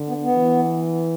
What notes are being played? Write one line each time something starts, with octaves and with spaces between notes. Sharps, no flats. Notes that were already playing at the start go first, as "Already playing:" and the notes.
Already playing: D3
B3
B3
E3